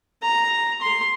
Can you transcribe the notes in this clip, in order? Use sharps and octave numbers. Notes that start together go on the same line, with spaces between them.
A#5
C6